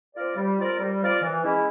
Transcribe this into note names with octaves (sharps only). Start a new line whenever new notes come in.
C4 F4 A#4 D5
G3
C4 F4 A#4 D5
G3
C4 F4 A#4 D5
E3
G#3 C#4 E4